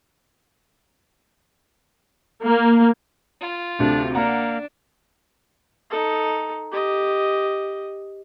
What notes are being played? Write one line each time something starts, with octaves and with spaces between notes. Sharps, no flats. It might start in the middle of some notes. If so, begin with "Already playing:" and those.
A#3
F4
D2 C3 A3 D4
A#3 D4 F#5 A#5
D#4 A4
G4 D#5